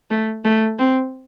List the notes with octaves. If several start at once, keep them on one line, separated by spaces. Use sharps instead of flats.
A3
A3
C4